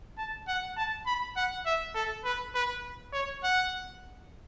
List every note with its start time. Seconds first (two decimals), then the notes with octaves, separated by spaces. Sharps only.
0.18 A5
0.48 F#5
0.76 A5
1.06 B5
1.36 F#5
1.65 E5
1.95 A4
2.24 B4
2.54 B4
3.13 C#5
3.43 F#5